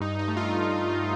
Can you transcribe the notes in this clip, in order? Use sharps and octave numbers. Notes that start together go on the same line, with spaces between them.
G2 D#4
D#4
A3
F4